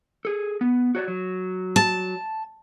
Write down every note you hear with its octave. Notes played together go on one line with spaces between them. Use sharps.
G#4 A4
B3
F#4 C#5 D5
F#3
A5